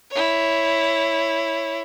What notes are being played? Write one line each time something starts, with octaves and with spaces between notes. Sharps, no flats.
E4 C#5